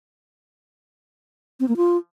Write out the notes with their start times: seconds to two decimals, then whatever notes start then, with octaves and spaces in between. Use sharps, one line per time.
1.60 C4
1.68 A#3
1.77 F4